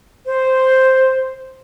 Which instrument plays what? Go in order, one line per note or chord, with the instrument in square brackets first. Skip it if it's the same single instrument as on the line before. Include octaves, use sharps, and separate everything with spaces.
[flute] C5